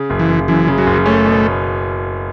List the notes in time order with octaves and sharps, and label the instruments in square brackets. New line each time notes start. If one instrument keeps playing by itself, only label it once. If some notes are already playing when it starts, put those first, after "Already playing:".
Already playing: [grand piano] C#3
F#1
[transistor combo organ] E3
[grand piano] F#1
[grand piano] F#2 [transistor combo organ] E3
[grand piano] C#3
[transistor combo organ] F#3
[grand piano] F#1
[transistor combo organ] A3 [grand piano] C#4
[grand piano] B2